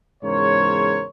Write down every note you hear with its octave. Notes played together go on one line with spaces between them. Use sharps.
E2 G#2 C#3 A#4 C5 C#5